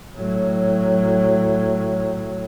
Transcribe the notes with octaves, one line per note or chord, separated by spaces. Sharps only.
A2 F#3